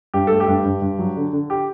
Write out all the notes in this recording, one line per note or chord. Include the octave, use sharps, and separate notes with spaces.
G2 G4
A3 A4
G4
G2
G2
G2
F#3
D3
D3
G4